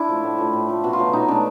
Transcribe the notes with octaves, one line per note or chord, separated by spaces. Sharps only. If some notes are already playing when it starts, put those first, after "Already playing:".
Already playing: D4 E4
F3 A3
A2
F3 A3
A2
F3 A3
B2 F#4
F4
F#3 A3
B2 D#4
F#3 A3 D4